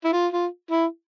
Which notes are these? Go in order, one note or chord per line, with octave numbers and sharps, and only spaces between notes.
E4
F4
F4
E4